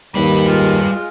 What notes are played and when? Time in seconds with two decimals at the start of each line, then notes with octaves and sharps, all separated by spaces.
0.15 D#2 G3 B4 B5
0.47 G#3 F4